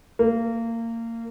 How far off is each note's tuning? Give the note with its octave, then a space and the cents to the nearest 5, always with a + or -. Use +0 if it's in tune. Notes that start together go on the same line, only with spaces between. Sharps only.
A#3 -25